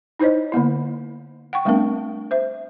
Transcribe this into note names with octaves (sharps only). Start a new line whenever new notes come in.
D#4 E4 C5 C#5 D#5
D3 A#3 B3 E4
F#5 G5 C#6
G3 A3 B3 C4 D4 A#4
C5 E5